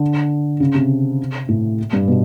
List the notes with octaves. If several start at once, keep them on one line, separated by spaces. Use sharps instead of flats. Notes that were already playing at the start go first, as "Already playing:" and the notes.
Already playing: D3
C#3
C3
A2
G2
B2